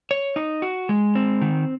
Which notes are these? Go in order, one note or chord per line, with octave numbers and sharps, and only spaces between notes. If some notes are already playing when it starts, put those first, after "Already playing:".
C#5
D#4
F#4
G#3
C4
D#3